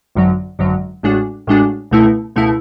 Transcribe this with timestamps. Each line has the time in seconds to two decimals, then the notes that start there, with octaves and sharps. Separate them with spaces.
0.15 G#1 F#2 D3 F#3
0.59 G#1 F#2 D3 F#3
1.03 A1 A2 G#3 D4 F#4
1.47 A1 A2 G#3 D4 F#4
1.91 C#2 B2 A3 E4
2.36 C#2 B2 A3 E4